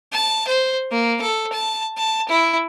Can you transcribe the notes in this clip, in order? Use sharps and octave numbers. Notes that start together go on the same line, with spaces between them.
A5
C5
A#3
A4
A5
A5
E4